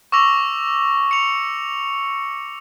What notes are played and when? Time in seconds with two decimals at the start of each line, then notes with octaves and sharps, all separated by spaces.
0.12 C#6 D6 E6 A#6 F7
1.11 C#7 F7